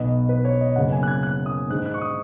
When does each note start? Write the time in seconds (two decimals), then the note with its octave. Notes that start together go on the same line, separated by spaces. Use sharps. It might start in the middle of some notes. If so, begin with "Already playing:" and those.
Already playing: B1 B2 B3 D#5
0.29 B4
0.45 C#5
0.61 D#5
0.76 F#1 F#2 C#3 B3 F#5
0.92 G#5
1.03 F#6
1.08 G#6
1.23 F#6
1.46 D#6
1.69 G#2 D#3 G#3 F#6
1.86 F#6
1.94 C#6
2.01 D#6